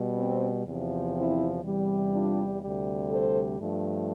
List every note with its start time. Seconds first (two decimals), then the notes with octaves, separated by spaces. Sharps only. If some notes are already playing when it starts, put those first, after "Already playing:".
Already playing: B2 G3
0.16 C4
0.64 E2 C3 F3
1.14 C4 E4
1.62 E2 C3 E3 G3
2.11 D4 F4
2.60 D2 C3 G3
3.10 A4 C5
3.58 G2 F3 A3